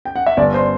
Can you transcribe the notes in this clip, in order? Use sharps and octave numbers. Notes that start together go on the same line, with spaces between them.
G5
F#5
E5
G1 D5
C5